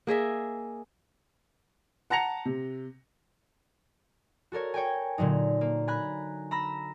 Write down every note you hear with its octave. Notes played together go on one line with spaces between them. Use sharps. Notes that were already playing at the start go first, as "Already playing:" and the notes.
A#3 G#4 D#5 E5
F#5 A5 A#5 A#6 C#7 F7
C3
F#4 A4 A#4 C#5
C#5 G5 G#5
A#2 D3 F#3 D#4
A#3
G#5 A#5 B5 F#6
A#5 B5 E6 A#6